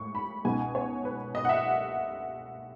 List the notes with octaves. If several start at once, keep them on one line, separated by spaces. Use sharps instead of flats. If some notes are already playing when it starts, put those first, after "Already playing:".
Already playing: A2 G#3 C#6
B5
C#2 B2 G#3 B3 D#4 G#5
C#5
B4
D#5
F#5
E5